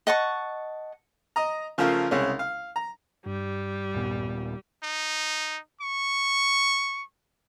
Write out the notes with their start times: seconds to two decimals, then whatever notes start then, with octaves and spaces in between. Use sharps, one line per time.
0.07 D#5 F#5 A5 C#6
1.36 D#5 A#5
1.78 C#3 F3 A3 F4 A#4
2.11 C2 C#3 G#3 C#4
2.39 F5
2.76 A#5
3.26 G2 G3
3.95 D#1 A#2 B3
4.83 D#4
5.81 C#6